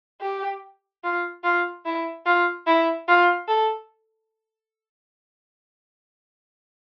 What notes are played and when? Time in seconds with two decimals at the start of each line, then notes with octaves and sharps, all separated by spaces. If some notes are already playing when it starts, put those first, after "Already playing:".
0.21 G4
1.03 F4
1.44 F4
1.85 E4
2.26 F4
2.67 E4
3.08 F4
3.48 A4